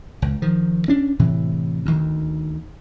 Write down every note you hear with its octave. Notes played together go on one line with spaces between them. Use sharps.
C#2
D#3 F3
C#4 D4
A2 C3 E3
D2 D#3